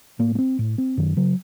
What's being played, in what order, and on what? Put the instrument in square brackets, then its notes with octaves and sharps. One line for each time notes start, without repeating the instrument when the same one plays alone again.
[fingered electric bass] A2 A#3
A#3
C4
A2
C4
F#2 D#3
C#3 F#3